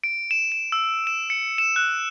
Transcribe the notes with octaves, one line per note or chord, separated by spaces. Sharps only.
D7
E7
E7
E6
E7
C#7
E7
F#6